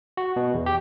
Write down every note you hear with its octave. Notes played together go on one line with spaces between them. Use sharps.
F#4
B2
E2
G4